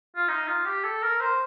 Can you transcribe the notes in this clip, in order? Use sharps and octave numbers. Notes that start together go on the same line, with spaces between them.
F4
D#4
F4
G4
A4
A#4
C5